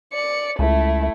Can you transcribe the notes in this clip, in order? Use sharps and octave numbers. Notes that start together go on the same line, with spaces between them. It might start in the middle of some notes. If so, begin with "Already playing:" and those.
D5 C#7
C#2 A3 E4